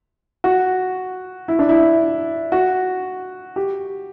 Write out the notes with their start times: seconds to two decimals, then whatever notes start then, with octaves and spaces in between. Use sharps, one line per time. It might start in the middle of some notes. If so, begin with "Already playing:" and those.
0.44 F#4
1.48 E4
1.59 D4
1.69 E4
2.52 F#4
3.56 G4